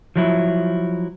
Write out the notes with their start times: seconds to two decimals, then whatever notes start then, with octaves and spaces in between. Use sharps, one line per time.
0.16 F3 F#3 E4